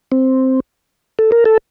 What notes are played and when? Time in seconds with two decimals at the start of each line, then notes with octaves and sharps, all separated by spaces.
0.12 C4
1.19 A4
1.32 A#4
1.45 A4